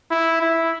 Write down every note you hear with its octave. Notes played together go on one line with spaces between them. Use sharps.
E4
E4